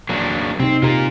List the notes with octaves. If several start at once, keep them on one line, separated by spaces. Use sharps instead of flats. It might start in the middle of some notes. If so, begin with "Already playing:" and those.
F#3 A#3 D4
C3 C4 D#4
C3 F4 A#4